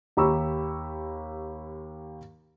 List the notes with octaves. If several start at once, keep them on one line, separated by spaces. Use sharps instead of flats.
D#2 G4 A#5 B5 C#6 E6